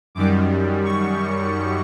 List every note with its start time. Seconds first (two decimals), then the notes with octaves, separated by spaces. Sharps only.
0.15 F#2 D#3 G3 D6
0.84 C#6